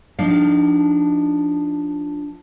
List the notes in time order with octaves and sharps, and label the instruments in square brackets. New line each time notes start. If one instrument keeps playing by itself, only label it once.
[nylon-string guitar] F3 D4 D#4 F5